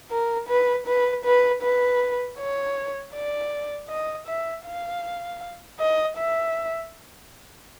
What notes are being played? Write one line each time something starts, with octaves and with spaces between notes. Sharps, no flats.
A#4
B4
B4
B4
B4
C#5
D5
D#5
E5
F5
D#5
E5